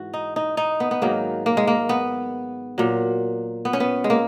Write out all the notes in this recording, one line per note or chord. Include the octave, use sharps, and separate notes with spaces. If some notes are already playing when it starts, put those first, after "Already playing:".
Already playing: G#2 E3 F#4
D#4
D#4
D#4
B3
B3
G#2 D#3 F#3 A#3
A#3
G#3
A#3
B3
A#2 F#3
B3
C#4
B3
G#3
A#3